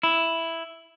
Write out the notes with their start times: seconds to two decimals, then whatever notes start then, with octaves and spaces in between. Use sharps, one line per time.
0.03 E4